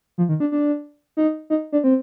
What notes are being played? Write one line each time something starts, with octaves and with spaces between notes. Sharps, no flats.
F3
D#3
D4
D4
D#4
D#4
D4
C4